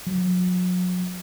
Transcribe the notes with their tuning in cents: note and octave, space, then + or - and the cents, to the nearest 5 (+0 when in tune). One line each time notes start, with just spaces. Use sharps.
F#3 -35